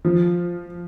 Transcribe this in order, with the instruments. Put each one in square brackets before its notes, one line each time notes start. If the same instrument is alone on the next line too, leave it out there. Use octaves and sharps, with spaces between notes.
[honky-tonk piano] F3